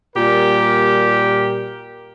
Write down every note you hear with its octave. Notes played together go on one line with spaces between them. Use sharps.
A#2 G3 G4 A#4